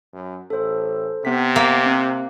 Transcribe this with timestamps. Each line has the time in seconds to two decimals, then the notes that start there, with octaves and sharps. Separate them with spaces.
0.13 F#2
0.50 A1 A4 C5
1.25 C3 B3 B6
1.56 A#3
1.86 C4 F#6